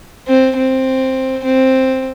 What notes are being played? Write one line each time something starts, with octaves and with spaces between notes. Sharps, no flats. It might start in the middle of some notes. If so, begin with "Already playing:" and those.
C4
C4
C4